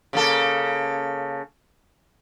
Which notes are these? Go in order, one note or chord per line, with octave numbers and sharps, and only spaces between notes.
C#3 A#3 A4